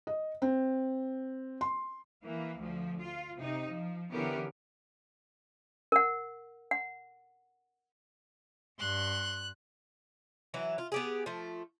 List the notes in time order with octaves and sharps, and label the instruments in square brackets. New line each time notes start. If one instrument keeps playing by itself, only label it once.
[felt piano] D#5
C4
C6
[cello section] E3 A#3
D2 F3
F4
C3 D#4
F3
D3 E3 B3 C#4 G4 A#4
[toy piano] A#4 F#5
F#5
[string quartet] G2 C6 [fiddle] F#6
[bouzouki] E3 F#3 E4
F4
B3 G4 G#4
F3 A3